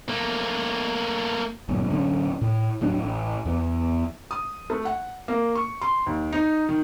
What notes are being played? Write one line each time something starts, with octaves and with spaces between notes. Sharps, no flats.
A3 A#3
G1 F#2 A#2
D1 F#2 D3 C#4
A2
D#1 A2 F#3 D4
A1
E2
D#6
A3
F#5
A#3
C#6
C6
D#2
D#4
D#3